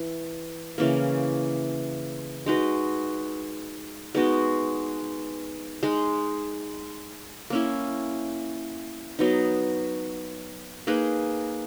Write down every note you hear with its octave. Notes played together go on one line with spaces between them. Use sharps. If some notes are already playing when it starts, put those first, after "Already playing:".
Already playing: E3
C#3 E3 A#3
G#3 D#4 F#4 B4
G#3 B3 D#4 F#4
G#3 D#4 G#4
A#3 C#4 E4
F#3 B3 D#4
A#3 D#4 G#4 B4